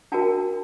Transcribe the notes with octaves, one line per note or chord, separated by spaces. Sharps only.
D4 F#4 A#4 G5 A5